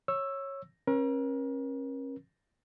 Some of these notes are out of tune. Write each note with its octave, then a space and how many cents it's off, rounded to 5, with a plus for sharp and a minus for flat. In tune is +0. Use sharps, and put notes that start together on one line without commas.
C#5 -15 E6 +5
C#4 -35 A#4 +35